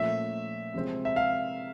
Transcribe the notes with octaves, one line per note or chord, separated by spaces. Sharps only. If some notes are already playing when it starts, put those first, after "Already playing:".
Already playing: A#2 F3 A3 C#4 E5
C3 F3 G#3 C4
E5
F5